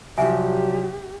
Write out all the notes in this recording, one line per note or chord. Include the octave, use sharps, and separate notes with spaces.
C2 F3 F#3 G4 E5 G#5